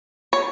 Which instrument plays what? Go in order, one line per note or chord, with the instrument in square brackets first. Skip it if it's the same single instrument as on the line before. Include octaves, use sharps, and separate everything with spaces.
[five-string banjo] C#5